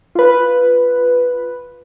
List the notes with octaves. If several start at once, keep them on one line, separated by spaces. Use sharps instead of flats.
F4 B4